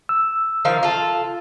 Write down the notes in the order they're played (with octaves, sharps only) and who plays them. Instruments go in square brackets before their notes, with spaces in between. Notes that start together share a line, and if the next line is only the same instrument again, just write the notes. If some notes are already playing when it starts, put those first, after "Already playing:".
[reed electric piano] E6
[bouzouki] D#3 F3 F5
F4 A4